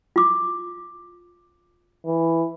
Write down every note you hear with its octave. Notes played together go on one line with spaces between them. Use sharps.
F4 D6
E3